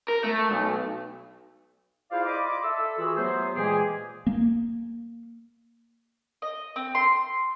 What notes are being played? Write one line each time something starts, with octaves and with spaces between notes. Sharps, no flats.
A#4
A3
B1
E4 F4 G#4 C5 D5 F5
D5 D#5 B5 C6 D6
A4 E5 E6
E3 F4 F#4 G#4 B5 E6
F#3 A3 B3 G4 G#4 C5
A#2 E3 G#3 A#3 G4 G#4
A#3
D#5
C4
C6